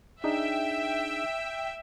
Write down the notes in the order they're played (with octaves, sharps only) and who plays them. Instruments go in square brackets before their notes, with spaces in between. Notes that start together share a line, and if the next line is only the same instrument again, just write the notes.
[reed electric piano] D4 D#4 G#4 [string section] E5 G5